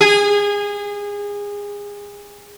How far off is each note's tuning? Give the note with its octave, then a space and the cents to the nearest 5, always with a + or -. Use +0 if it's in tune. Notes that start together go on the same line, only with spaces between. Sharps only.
G#4 -25